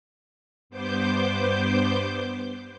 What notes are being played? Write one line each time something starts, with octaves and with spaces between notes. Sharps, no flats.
G2 B3 C5 D6 G6